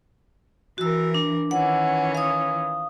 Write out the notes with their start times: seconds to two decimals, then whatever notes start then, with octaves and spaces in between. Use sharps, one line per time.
0.78 E3 F#4 A#4 E6
1.14 D4
1.51 D#3 E3 C#4 F#5
2.15 F5 D#6